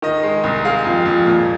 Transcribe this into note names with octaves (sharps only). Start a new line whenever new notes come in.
D#3 D#5
G#3
C2
G#3 F5
F2
F2
A#2